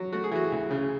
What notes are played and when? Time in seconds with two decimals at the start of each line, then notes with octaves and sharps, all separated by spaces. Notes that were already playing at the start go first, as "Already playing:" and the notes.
Already playing: F#3
0.12 A3 F#4
0.24 G#4
0.32 E3 F#4
0.52 D2
0.71 C#3